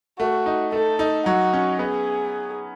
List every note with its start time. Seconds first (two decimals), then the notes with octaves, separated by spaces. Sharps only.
0.20 A3 F#4
0.46 D#4
0.72 A3 A4
0.99 D#4
1.26 F#3 F#4
1.53 C#4
1.79 B3 G#4